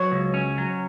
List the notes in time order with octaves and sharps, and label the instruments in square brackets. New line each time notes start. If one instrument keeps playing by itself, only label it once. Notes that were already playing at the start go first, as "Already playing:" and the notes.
Already playing: [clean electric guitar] F#3 [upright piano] C#5
[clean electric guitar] C#2
C#4
F#3